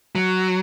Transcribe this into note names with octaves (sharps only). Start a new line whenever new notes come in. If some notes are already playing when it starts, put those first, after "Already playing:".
F#3